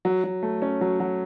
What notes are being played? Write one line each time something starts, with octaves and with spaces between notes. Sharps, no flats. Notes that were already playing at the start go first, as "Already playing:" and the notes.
F#3
F#3
A3
C#4
F#3
F#3